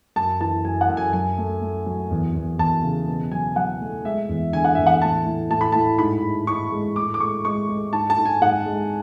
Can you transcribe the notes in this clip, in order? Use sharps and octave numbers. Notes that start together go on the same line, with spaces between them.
F#2 A5
E3 A5
F#2 G#5
F#5
F#2
G#5
F#3 G#5
A3
A3
F#3
E2
E2
E2 A5
C#3
B2
F#3 G#5
F#3 F#5
A3
G#3 E5
E2
D3 G#5
F#5
E2 E5
F#5
A2 A5
A2
A2 A5
B5
A2 A5
G#2 B5
G#2
G#2 C#6
G#3
A2 D6
D6
G#3 C#6
G#3 C#6
G#3
G#2 A5
A5
G#2
G#5
G#2 F#5
G#3